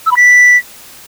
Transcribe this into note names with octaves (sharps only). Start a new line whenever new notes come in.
E6
B5
B6